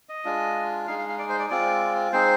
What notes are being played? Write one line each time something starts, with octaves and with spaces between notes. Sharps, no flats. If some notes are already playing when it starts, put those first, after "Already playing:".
D#5
G#3 D4 F4
G#3 D#4 F5
F5
F5
D5
C5
D5
G#3 C4 F4 D5
G#3 C4 D#4 C5